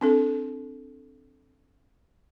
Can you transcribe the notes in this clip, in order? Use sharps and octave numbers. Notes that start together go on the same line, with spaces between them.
C4 D4 A4